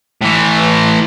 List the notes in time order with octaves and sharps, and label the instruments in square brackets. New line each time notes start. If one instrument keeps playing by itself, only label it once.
[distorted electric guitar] A2 E3